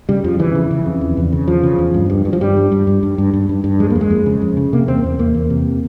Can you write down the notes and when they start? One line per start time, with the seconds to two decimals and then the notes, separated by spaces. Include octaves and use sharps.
0.09 C#3 G3
0.24 F2 F3
0.39 C#3 E3
0.55 C#3
0.71 C#3
0.86 F2
1.01 E2
1.17 E2
1.33 C#3
1.48 E2 F3
1.63 C#3
1.79 E2
1.94 G2
2.10 G2
2.25 G2
2.33 F3
2.40 G2 G3
2.57 G2
2.72 G2
2.87 G2
3.03 G2
3.18 G2
3.34 G2
3.49 G2
3.64 G2
3.79 F2 G#3
3.90 A#3
3.95 F2
4.01 G#3
4.11 F2
4.26 C#3
4.42 F2
4.57 C#3
4.73 C3 A#3
4.88 E2 C4
5.04 E2
5.19 E2 A#3
5.34 E2
5.50 C3